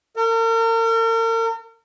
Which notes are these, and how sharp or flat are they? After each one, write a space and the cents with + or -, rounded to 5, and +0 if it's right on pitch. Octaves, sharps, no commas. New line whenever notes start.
A#4 -40